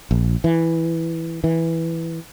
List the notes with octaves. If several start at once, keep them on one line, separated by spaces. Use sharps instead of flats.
A#1
E3
E3